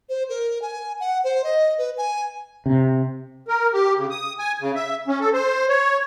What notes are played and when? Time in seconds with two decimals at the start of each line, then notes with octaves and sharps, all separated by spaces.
0.09 C5
0.29 A#4
0.62 G#5
1.00 F#5
1.24 C5
1.44 D#5
1.78 B4
1.98 G#5
2.66 C3
3.48 A#4
3.73 G4
3.97 C#3
4.10 D#6
4.39 G#5
4.61 C#3
4.75 E5
5.07 C#4
5.21 A4
5.33 C5
5.69 C#5